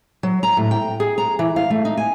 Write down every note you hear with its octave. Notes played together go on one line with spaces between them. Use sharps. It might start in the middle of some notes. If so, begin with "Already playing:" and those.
F#3
A#5
A2
G5
G#4
A#5
E3
F5
A3
D#4
G#5